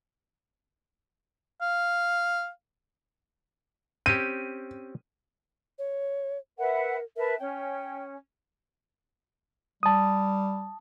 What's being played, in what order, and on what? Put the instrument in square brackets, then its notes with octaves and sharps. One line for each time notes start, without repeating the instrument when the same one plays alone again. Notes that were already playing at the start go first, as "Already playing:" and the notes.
[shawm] F5
[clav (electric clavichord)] C4 C#4 G4 [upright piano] D#7
[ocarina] C#5
[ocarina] A#4 [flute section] B4 E5 F#5
[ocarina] A#4 [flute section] B4 E5 A5
[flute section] C#4 [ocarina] G5
[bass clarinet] G3 [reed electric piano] A5 D#6